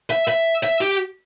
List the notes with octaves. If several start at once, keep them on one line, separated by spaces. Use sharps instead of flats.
E5
E5
E5
G4